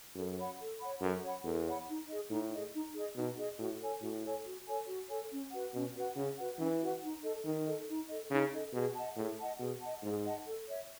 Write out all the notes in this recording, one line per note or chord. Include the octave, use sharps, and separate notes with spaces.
F#2 A4
C#5 F#5 B5
A4
C#5 F#5 B5
F#2 A4
C#5 F#5 B5
E2 A4
C#5 F#5 B5
D#4
G#4 D#5
A2 D#4
G#4 D#5
D#4
G#4 D#5
B2 D#4
G#4 D#5
A2 F#4
A4 C#5 G#5
A2 F#4
A4 C#5 G#5
F#4
A4 C#5 G#5
F#4
A4 C#5 G#5
C#4
F#4 B4 F#5
B2 C#4
F#4 B4 F#5
C#3 C#4
F#4 B4 F#5
E3 C#4
F#4 B4 F#5
D#4
A4 D#5
D#3 D#4
A4 D#5
D#4
A4 D#5
C#3 D#4
A4 D#5
B2 G#4
D#5 F#5 A5
A2 G#4
D#5 F#5 A5
B2 G#4
D#5 F#5 A5
G#2 G#4
D#5 F#5 A5
A4
C#5 E5